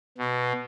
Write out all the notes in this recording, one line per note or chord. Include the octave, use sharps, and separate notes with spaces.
B2